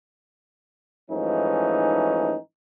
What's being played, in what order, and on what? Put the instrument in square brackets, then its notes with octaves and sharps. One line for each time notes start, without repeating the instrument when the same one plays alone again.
[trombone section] G#2 E3 F3 A3 C#4 D#4